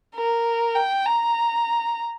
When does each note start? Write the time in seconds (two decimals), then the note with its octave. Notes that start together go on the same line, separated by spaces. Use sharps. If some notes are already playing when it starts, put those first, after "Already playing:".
0.16 A#4
0.76 G5
1.06 A#5